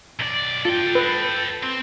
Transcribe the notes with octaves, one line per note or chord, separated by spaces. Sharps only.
B1 D5
F4 A4 G5
B4
C4